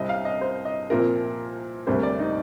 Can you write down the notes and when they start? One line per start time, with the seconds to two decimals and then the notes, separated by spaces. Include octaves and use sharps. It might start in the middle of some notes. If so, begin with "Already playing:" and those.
Already playing: C2 C3 G3 C4 D#5
0.09 F5
0.25 D#5
0.41 C5
0.65 D#5
0.90 C2 A#2 F3 C4 A#4
1.87 D2 C3 G3 A#3 C5
2.03 D5
2.20 D#4